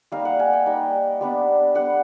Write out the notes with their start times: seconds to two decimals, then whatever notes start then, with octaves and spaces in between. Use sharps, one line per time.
0.12 G3 A#3 D#4 F5
0.25 F#5
0.39 G#5
0.53 G5
0.66 G3 A#3 D#4
1.21 G3 B3 D4
1.75 G3 B3 D4 F#5